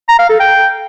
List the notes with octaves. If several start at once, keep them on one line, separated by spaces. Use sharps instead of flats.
A#5
F5
A4
G5